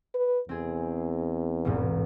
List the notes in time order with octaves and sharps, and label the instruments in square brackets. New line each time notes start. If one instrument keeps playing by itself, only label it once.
[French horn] B4
[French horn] E2 [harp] C4 G#4
[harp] E1 A1 G#2